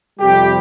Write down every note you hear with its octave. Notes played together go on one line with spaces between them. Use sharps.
F2 C3 G3 G4